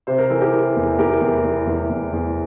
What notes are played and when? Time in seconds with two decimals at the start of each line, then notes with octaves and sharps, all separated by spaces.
0.07 C3 C5
0.18 A#4
0.30 E3 A4
0.41 G4 A#4
0.53 E3
0.76 E2
0.98 E2 G4 A#4
1.21 E2
1.44 E2
1.67 E2
1.90 E2
2.13 E2